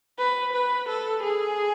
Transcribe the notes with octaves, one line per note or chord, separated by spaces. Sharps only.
B4
B4
A4
G#4